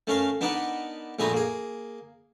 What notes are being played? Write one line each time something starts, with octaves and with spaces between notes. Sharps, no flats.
A3 C#4 A#4 F5
B3 D4 D#4 A#4 B4 F#5
A#1 A3 G#4 B4 E5 A#5
A#3 G#4